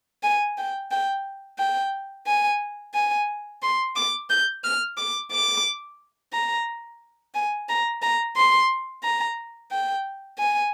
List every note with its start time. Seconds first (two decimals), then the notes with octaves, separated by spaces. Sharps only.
0.23 G#5
0.57 G5
0.91 G5
1.59 G5
2.27 G#5
2.94 G#5
3.62 C6
3.96 D6
4.30 G6
4.64 F6
4.97 D6
5.31 D6
6.33 A#5
7.34 G#5
7.69 A#5
8.02 A#5
8.36 C6
9.03 A#5
9.72 G5
10.39 G#5